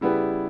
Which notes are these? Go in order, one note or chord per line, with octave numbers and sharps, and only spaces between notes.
C#3 G3 B3 E4 G4 B4